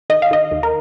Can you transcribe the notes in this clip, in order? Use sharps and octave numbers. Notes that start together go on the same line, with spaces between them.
D#3 D#5
F5
D#3 D#5
D#2
A#4